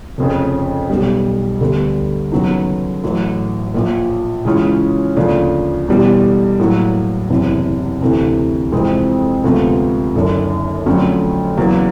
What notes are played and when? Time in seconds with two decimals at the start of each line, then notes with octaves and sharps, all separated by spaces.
0.18 F1 F2 C#3
0.90 B1 B2 G3
1.60 D2 D3 G3 B3
2.32 D#2 C#3 F#3 B3 D#4
3.03 A1 A2 F#3
3.74 A#1 A#2 F3
4.45 C#3 E3 G#3 C#4 F4
5.16 D2 C#3 F3 A#3 D4
5.88 E2 B2 G3
6.59 A2 F#3 A#3
7.30 F#1 E2 C3
8.01 D2 C3 E3
8.72 F2 C3 E3 G#3 C4
9.44 D2 C3 F3 G#3 B3
10.15 F#1 F#2 D3
10.86 F2 D3 F#3 A3 C#4
11.58 E2 C#3 F#3 A#3